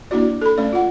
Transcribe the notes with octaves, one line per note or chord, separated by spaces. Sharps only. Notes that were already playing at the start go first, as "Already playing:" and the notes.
A#3 D4 E4 F#4 D5
A4 B5
A3 C#4 D5
F4 F#5